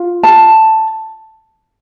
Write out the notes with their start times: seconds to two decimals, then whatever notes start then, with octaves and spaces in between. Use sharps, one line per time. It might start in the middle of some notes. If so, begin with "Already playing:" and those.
Already playing: F4
0.23 A5